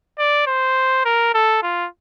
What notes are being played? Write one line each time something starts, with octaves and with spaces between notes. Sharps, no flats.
D5
C5
A#4
A4
F4